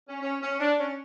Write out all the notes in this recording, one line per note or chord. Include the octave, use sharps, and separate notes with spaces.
C#4
C#4
C#4
D4
C#4